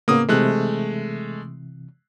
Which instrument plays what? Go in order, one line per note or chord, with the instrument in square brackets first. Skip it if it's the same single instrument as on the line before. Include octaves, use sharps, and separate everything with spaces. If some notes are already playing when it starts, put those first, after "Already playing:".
[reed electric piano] A2 C#3 B3 [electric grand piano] A#3 D#6
[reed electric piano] C3 E3 [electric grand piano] G#3 A3 F#6